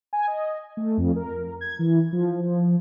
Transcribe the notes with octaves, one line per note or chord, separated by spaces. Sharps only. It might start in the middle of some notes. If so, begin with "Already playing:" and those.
G#5
D#5
A3
F2
A#4
G#6
E3
F3
F3